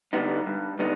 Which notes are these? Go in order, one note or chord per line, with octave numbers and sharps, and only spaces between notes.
D3 G3 B3 D#4
G2
D3 G3 B3 D#4